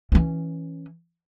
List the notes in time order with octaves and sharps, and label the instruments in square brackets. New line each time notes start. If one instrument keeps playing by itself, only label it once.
[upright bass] E3 C#4